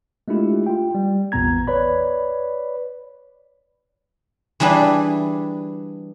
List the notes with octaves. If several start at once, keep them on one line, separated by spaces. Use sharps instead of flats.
G#3 A3 D4 E4 F4 G4
F4 G5
G3
A1 E2 A#2 B3 A#5 G#6
B4 C#5 D5 B5
E3 G3 D4 G#4 B4